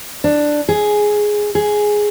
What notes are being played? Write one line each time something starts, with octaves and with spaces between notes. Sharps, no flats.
D4
G#4
G#4